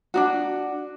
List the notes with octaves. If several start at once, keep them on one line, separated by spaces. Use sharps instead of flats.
D4 D#4 F#4